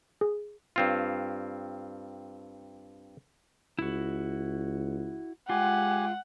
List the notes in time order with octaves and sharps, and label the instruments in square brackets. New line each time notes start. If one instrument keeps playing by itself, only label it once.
[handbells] G#4
[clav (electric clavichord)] G2 C4 F4
[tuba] C#2 [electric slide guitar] E4 F#4
[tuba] G#3 [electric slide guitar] F4 [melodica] G4 G#5 [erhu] F#5